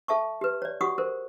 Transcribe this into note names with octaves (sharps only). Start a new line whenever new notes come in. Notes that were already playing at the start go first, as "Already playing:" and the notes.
A4 E5 A5 C#6
G4 B4
C#5 D5
F#4 G4 F#5 C#6 D#6
A4 A#4 C5